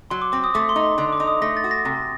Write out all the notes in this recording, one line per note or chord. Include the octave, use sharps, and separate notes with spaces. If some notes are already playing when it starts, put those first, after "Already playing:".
F#3 C6
D6
C4 D6
D#6
A3 D6
C6
D#4
C6
D3 C6
D6
D#4
D#6
A3 A#6
A6
F#4
A#6
C3